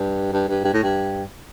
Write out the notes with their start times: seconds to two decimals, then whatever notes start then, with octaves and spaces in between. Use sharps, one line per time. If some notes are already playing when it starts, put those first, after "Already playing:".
Already playing: G2
0.32 G2
0.48 G2
0.64 G2
0.73 A2
0.83 G2